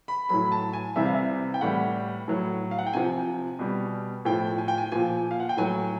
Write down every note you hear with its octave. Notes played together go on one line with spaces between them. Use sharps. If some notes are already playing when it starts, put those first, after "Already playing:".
B5
A2 F#3 B5
A5
G#5
C3 E3 G3 E5
F5
E5
G5
A2 E3 G3 F#5
A2 F#3
F5
F#5
G5
C3 F3 G#5
B2 G3
A2 F3 G5
G#5
G5
G#5
A#2 F3 G#5
F5
F#5
G5
A2 F#3 G#5